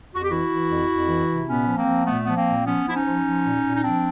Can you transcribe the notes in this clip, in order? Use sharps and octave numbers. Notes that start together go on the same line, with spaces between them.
F2 F#4
G4
E3 E4 F#4
E3
F2
F2
E3
C3
A#2 B3 C#4
F3
A#3 C4
F3
A#2 A3 B3
F3 B3
A#3 C4
A#2
F3 B3 C#4
F3 E4
C#4 D#4
F3
F3
A#2
A#2
D#4
F3 C4 D4